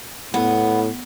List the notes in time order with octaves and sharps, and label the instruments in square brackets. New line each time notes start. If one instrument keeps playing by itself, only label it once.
[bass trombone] A2 [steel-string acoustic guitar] B3